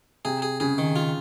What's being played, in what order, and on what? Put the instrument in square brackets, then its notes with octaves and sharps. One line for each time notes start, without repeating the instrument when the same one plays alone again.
[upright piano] C3 [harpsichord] G#4
[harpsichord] G#4
[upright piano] C#3 [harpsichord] G#4
[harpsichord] D#3
F4